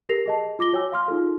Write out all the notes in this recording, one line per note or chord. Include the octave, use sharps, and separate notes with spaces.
G4 A4 A#4 A#6 C7 F7
G#4 D#5 A5
F4 D6 A#6 G7
F#4 C#5 G5 G#5 E6
F5 C6 F6
D#4 F4 G#4 A4